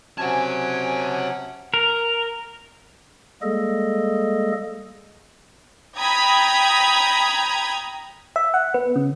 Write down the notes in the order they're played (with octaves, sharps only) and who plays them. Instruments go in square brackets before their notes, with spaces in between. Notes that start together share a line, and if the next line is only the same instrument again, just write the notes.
[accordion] C3 F#3 C#4 [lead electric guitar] F#5 A5 [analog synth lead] G#5
[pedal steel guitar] A#4
[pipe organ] G3 G#3 A#3 G#4 A4 D#5
[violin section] G5 A#5 B5 D#6 G#6
[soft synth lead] E5
F#5
B3
C#3